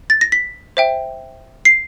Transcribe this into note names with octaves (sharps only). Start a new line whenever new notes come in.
A6
A#6
B6
C5 E5 G5
C7